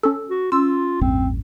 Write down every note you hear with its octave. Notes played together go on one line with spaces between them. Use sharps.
C#4 A4 E6
F#4
C#4 F4 C6 E6
A1 E2 G2 C4